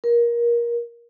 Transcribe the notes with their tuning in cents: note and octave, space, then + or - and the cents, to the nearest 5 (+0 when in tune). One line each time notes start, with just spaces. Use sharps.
A#4 +20